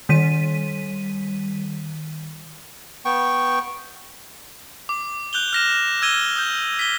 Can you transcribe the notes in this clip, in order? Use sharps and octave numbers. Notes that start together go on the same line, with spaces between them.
D#3 G3 B6 D#7
B3 G5 C#6
D6
F#6 G6 F7 G7
F6 A#6 E7
E6 G#6 D#7 G7
D#6 G6
B6 G7